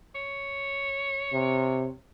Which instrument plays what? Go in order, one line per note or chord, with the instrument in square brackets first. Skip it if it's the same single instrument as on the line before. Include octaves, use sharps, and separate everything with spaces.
[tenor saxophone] C#5
[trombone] C3